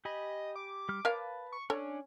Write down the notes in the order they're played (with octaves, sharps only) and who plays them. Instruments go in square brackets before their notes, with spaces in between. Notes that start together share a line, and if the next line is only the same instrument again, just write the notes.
[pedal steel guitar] G4 G#5 B5 [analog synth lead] D#5
[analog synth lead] D6
[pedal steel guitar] G3 F6
[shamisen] A#4 C#5 F5 [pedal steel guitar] B4 A5
[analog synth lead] C#6
[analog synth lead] C#4 [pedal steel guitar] D4 [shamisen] A4 C#5